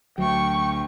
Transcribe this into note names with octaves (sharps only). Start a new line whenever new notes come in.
D2 F#3 G5 C#6